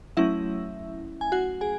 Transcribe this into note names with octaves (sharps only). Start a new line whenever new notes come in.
F#3 A3 C#4 E4 E5
G#5
F#4 F#5
G#4 G#5